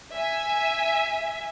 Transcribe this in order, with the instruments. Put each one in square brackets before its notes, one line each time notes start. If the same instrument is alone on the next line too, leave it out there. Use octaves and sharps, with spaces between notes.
[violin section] E5 G#5